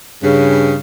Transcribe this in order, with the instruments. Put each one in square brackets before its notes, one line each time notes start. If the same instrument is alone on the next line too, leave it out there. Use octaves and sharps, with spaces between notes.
[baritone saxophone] G2 [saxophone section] C#3